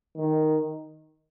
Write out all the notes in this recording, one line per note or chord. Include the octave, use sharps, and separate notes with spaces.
D#3